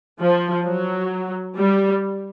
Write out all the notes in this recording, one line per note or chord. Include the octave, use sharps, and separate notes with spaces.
F3
F#3
G3